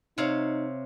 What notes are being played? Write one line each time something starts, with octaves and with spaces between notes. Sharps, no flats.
C3 D#4 C#5 F5